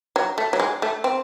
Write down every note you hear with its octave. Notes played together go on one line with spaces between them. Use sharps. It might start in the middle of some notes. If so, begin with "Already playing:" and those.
F#3
A3
F#3
G#3
A3
C4